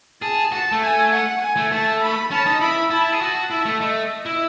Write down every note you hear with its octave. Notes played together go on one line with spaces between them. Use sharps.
G#4 A5
F#4 A5
A3
G#5
F#5
G#5
A3
A3 A5
B5
C#4 A5
D#4
E4 B5
E4 A5
G#4
F#4 A5
E4 A5
A3
A3 D#5
E4